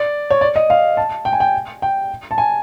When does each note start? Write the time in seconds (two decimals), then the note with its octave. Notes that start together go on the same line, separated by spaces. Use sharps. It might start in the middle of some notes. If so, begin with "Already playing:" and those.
Already playing: D5
0.30 C#5
0.41 D5
0.56 D#5
0.70 F5
0.97 A5
1.25 G5
1.33 G#5
1.40 G5
1.82 G5
2.31 A5
2.38 G#5